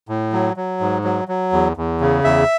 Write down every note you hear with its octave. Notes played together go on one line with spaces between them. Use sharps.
A2
F#3
F#3
G#2
F#3
F#3
E2
E2
C#3
E2 E5